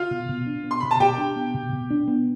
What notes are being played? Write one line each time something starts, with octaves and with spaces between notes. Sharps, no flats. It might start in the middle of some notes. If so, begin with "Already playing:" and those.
Already playing: F4 F5
B2
B2
D4
B3
C6
B2 B5
A5
B2 G4 G5
D4
B3
B2
B2
D4
B3